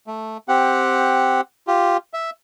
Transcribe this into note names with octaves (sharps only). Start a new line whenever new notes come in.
A3
C4 G4 F#5
F4 G4
E5